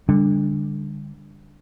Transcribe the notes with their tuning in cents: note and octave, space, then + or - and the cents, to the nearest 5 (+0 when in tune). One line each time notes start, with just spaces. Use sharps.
D3 +0 G3 +40 D4 +0